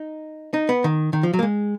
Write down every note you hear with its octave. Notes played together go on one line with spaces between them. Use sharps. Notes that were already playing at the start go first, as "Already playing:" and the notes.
Already playing: D#4
D#4
B3
D#3
D#3
F3
F#3
A#3
G#3